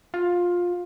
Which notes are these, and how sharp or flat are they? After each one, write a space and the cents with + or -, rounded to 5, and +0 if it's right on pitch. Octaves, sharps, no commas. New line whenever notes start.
F4 +15